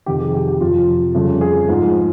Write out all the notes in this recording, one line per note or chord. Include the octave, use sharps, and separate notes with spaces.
F2 C3 D#3 G4
G#4
G4
G4
F2 C3 F3 F4
F2 C#3 G3
G#4
G#2 F3